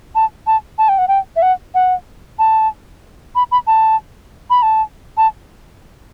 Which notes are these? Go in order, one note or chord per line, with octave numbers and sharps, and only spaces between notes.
A5
A5
A5
G5
F#5
G5
E5
F#5
F#5
A5
B5
B5
A5
B5
A5
A5